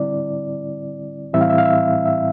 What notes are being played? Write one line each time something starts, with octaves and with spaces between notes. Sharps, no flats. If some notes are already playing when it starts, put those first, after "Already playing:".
Already playing: D3 G3 C4 E4 D5
A2 E3 G3 C4 E4 E5
F5
E5
F5
E5
E5